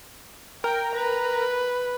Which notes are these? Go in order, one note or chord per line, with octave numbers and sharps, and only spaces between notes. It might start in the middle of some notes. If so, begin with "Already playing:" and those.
A#4 G5
B4